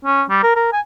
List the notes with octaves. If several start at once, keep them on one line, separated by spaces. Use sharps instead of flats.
C#4
G3
A#4
A#4
G#5